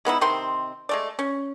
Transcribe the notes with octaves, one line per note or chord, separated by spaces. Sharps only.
G#3 B3 D#4 E4
C3 D#3 C4 C6
G#3 A3 D5
C#4